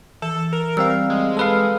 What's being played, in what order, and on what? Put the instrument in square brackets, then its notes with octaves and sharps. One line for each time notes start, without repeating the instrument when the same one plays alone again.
[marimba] E3 [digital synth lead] A4
[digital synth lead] A#4
[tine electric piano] G3 C4 F5 [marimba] E6
[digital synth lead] G#3
[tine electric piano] A4 B4 F5